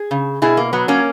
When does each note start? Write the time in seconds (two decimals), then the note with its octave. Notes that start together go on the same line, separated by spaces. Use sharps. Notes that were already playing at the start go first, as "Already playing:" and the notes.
Already playing: G#4
0.11 C#3
0.42 B2 E4 G#4
0.57 A#3
0.73 F#3 B3
0.88 A#3 C#4